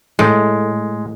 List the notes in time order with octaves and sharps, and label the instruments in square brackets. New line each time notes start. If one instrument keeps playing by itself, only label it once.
[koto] A2 [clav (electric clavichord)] G#3